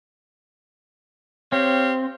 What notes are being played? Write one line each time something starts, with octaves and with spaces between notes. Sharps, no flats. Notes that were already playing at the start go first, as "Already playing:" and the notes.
C4 G4 C#5 F5